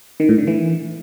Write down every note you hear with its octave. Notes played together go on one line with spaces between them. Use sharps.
D#3
A2
D3
E3